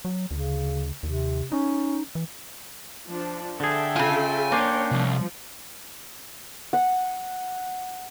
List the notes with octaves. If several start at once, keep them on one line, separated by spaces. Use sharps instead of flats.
F#3
D2 C#3
D#2 C3
C#4 D#4
E3
F3 D4
D3 G#4 A4 E5 G5
C#3 F4 G#5
A#3 C#4 D4 C5 C#5 G5
C2 F3
F#5